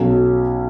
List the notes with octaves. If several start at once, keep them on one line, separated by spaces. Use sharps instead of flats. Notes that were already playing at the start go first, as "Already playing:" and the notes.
Already playing: B1 B2 F#3 C#4